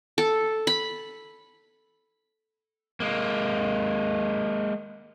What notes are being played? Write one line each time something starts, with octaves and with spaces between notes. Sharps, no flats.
A4
B5
G#3 A#3